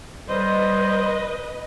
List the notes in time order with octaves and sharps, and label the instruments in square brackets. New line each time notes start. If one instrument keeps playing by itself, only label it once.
[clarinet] G3 [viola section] B4 D#5 [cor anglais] C5